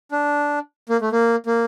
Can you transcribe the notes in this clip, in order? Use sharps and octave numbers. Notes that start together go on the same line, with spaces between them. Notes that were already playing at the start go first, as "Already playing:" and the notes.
D4
A#3
A3
A#3
A#3